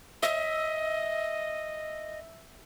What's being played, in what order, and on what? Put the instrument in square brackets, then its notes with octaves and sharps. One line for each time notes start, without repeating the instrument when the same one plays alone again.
[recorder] D#5 [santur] E5